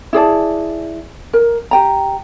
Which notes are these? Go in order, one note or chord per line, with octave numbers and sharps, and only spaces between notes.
E4 G#4 D5 A5
A#4
G4 G5 A#5